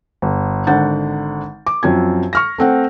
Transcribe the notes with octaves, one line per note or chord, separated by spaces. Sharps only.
G1
G#1 D3 F#5 G6 A6
D6
F#2 F3 C4 G#6
C#6 F6 A#6
A3 C4 F#5